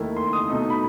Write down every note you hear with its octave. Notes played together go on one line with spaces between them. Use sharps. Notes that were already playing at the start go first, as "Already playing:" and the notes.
Already playing: D#2 D#3 A3 E4
C6
D#6
B2 A3 D#4
B5